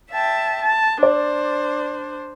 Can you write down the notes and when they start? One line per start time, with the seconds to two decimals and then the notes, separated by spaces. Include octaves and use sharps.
0.13 E5 G5 A5
0.62 A5
1.03 D4 C5 D5